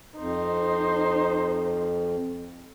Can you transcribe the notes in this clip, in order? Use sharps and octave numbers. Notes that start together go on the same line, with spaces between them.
F2 D#4 C5